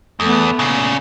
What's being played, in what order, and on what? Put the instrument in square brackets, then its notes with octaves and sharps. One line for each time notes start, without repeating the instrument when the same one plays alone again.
[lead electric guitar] E2 [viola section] A3 B3
[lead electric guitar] A#2 C#3